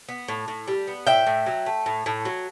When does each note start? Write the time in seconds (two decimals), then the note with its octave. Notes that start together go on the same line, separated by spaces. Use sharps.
0.09 B3
0.28 A2
0.48 A2
0.67 G3
0.88 B3
1.07 A2 E5 G5
1.27 A2
1.46 F#3
1.66 A3
1.86 A2
2.06 A2
2.25 F#3